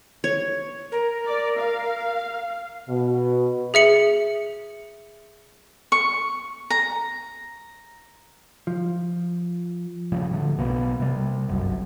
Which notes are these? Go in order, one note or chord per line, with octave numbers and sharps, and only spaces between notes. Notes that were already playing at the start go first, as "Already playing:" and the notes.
C#5
A#4
D5
F5
B2
G#4 E5 C#7 F#7
C#6
A#5
F3
A#2 C#3 F3 G3
A2 D3
B1 B2 A#3 B3
C3 G3
G1 C2 F#2